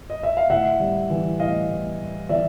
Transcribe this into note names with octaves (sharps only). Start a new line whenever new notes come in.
D#5
E5
F5
A2 E5 F#5
G3
E3
A2 D#5 F5
A2
G3
E3 D5 E5